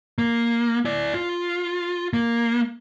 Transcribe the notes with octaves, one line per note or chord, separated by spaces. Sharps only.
A#3
E4 D5
F4
A#3